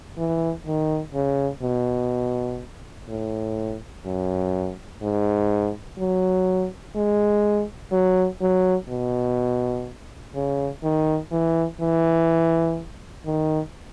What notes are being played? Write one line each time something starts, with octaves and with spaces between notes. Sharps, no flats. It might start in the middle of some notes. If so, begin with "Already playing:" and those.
E3
D#3
C#3
B2
A2
F#2
G#2
F#3
G#3
F#3
F#3
B2
C#3
D#3
E3
E3
D#3